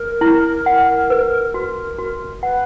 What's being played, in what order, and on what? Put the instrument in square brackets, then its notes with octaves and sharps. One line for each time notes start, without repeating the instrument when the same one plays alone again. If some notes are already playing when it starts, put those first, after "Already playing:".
Already playing: [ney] A#4
[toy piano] E4
F#5
B4
F#4
F#4
[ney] B4 [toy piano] F#5